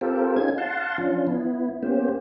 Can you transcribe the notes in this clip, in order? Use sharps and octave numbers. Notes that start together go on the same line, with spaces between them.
C4 F4 G4 A4 A#4 C5
C#4 D#4 F4 G#4 G#6
F5 F#5 A5 C6
F3 C#4 D4 F4
B3 E4
A#3 B3 C#4 G4 C5